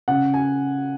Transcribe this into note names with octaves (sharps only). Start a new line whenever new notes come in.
C#3 F#5
G#5